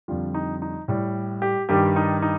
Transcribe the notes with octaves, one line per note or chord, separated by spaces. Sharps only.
F2 D3 G3 F4
D#4
D#4
A2 G3
G4
G2 D#3 G3 G4
D#4
D#4